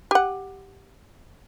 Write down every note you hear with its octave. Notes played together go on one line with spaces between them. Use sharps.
G4 F#5